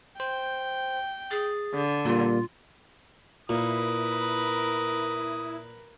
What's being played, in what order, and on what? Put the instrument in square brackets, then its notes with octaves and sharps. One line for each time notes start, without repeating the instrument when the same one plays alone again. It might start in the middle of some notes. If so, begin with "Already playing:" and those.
[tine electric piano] C5 [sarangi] G5
[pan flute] G#4 [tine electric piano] A6
[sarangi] D3
[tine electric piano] A#2 G3 A#3 [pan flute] F4
[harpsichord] A#2 [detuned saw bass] E4 [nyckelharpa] A#4 B4 [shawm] D#6